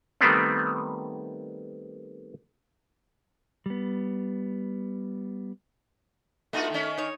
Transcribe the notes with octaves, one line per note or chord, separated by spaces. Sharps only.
D#3 G3 A3 B3 C4
G3 B3
A3 A#3 D#4 F4 F#4
D#3 C#4
D#4 C#5